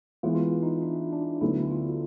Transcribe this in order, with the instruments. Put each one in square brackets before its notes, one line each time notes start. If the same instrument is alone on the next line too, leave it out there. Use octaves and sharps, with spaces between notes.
[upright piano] E3 G#3 B3 [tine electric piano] F4
[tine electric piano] F4
E4
D#4
D4
D4
[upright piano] D2 D3 F#3 B3 D#4 [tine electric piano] E4
[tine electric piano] F4